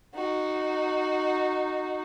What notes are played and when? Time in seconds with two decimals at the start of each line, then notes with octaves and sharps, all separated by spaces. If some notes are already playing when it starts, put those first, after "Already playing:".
0.15 D#4 F#4